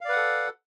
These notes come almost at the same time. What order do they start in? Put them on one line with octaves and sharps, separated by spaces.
F5 D5 B4 F#5 A4